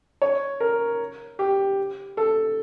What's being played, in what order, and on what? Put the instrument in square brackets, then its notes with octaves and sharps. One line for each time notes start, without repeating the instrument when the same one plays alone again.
[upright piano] C#5
A#4
G4
A4